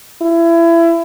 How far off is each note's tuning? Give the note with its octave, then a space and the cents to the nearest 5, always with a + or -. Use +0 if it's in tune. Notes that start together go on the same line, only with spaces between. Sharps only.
E4 +25